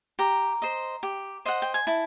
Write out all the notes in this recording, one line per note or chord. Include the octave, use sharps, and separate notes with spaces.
G4 A#5
C5 D#5
G4
C5 D#5 F#5
G5
G#5
E4 A5